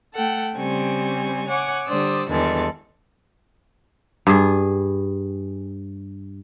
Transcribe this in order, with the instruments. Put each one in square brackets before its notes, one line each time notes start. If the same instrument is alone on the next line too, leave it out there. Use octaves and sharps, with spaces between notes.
[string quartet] A3 A4 F#5 G5
C#3 G3 C4 C5 G#5 C#6
C#5 F#5 G#5 C#6 D6
D3 G3 C5 D5 D#6 E6
E2 G2 D#3 G#3 A4 A6
[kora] G2 G#4